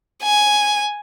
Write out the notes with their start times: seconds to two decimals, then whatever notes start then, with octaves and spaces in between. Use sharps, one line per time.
0.23 G#5